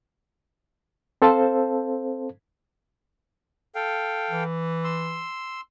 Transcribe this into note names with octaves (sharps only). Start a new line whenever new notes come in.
C4 A4 C5 F5 A5
A4 F5 G5
E3
C6 E6